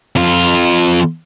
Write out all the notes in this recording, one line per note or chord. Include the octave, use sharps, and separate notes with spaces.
F2 F4